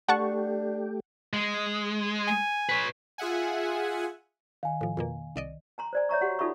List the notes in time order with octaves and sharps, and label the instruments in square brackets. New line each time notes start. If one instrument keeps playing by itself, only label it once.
[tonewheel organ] A3 G4 [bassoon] D4 [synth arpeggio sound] F#5 A5 C#6
[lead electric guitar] G#3
[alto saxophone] G#5
[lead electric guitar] B4 C#5
[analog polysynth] F4 G#4 E5 F#5 G#5
[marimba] D#3 [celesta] F5 G#5
[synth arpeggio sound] A2 F3
F2 B2 A#3
C2 D5 D#5
[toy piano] G#5 A#5 C6
C5 D5 G#5
C#5 E5 A#5 C#6
F#4 G4 F#5 C6
D#4 F4 A4 E5 B5 C#6